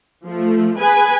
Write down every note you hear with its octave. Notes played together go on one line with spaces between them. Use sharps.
F3 A3
G#4 B4 G#5